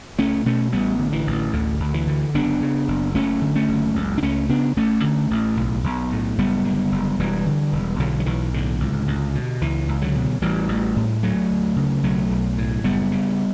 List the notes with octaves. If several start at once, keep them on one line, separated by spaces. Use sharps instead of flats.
C#2 A3 C#4
B2 A3 C#4
A1 G3 B3
D3
E3
A1
D2 D3
D2
E3
D3
F#1 B3 D4
C#3
F#1
F#1 A3 C#4
D3
A3 C#4
F#1
C#2
D4
C#2 A3 C#4
C#3 B3 D4
A1 A3 C#4
D3
A1
B1
B1
A2
F#1 G3 B3
D3
F#1
E1 E3 G3
D3
E1
B1 D3 F#3
F#3
B1 E3
A2 D3
C#2
C#2
B2
C#2 E3
C#2
D3 F#3
B2
A1 E3 G3
A1
A2
D2 F#3 A3
D2
C#3
B1 F#3 A3
B1
A2
F#1 G3 B3
C#3